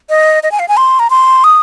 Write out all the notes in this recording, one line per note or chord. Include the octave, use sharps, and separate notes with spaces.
D#5
D#5
G#5
F5
G#5
C6
A#5
C6
D#6